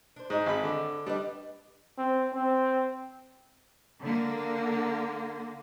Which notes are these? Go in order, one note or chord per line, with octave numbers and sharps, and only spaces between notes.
D4 C5
G#2 D#5
G#1 G#4 B5
D3
G3 D4 B4 D#5
C4
C4
D3 A#3